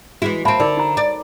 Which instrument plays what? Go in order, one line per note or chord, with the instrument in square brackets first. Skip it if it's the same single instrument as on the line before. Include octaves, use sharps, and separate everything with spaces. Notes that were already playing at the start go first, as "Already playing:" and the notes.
[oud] E3 G#3 E4 [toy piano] F#4
[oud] A#3 C4 [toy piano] E5 A5 B5
[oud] D3 [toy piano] D#4 A#4 D5
[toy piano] D#4 A#5
[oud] D5